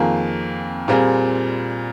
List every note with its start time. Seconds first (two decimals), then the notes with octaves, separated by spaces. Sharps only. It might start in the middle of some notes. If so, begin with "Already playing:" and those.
Already playing: F2 D#3 A#3 F4 G#4
0.88 A#2 G3 C4 F4 G#4